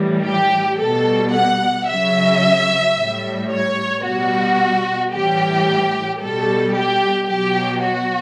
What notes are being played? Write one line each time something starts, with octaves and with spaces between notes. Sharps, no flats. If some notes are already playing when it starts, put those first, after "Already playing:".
Already playing: A2 E3 G3
G4
B2 G3 A4
F#5
C#3 F#3 E5
A2 G3
C#5
B2 G3 F#4
A2 E3 G3 G4
B2 G3 A4
G4
B2 F#3 G4
F#4